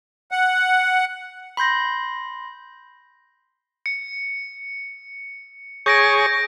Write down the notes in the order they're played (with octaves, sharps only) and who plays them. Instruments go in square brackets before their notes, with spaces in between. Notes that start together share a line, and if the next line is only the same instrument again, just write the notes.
[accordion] F#5
[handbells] B5 C6 G6 A#6
[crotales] C#7
[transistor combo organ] G#4 C#5 C#6 [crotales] G6 A#6 D7